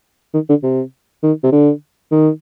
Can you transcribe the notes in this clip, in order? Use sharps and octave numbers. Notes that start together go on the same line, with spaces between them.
D#3
D3
C3
D#3
C3
D3
D#3